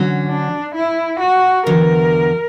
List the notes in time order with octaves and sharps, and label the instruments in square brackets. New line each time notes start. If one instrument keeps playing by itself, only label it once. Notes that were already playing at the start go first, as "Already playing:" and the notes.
Already playing: [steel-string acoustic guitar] D3 F#3 C#4
[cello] D4
E4
F#4
[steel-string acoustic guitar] E2 D3 F#3 [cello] A#4